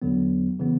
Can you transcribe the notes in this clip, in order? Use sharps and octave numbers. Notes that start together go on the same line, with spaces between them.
E2 D3 F#3 B3
C#3 E3 B3